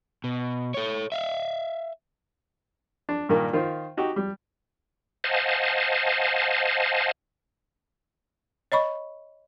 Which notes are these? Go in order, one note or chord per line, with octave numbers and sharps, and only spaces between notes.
B2
A4 C#5
E5 F5
D4
G2 A#2 D#3 A#3
D#3 F4 C5
D#4 F#4 G4
G3
C5 D#5 F5 F#5 G#5 A5
C#5 D#5 B5 C#6